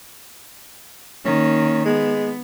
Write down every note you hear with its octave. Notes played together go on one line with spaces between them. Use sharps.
D#3 A#3 C#4
G#3 B3